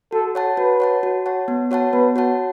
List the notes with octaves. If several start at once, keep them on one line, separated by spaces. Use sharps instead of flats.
F#4 A4
C#5 F#5 A5
F#4 B4
C#5 F#5 A5
F#4
C#5 F#5 A5
B3
F#4 C#5 F#5 A5
B3 B4
F#4 C#5 F#5 A5